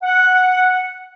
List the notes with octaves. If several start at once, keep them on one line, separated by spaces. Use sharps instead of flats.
F#5